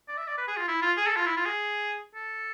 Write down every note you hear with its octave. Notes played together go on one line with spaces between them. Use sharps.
D5
E5
D5
B4
G#4
F4
E4
F4
G#4
A4
F4
E4
F4
G#4
A4